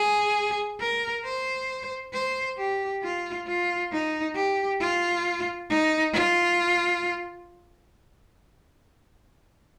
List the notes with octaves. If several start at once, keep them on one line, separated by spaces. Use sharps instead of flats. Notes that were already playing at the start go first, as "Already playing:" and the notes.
Already playing: G#4
A#4
C5
C5
G4
F4
F4
D#4
G4
F4
D#4
F4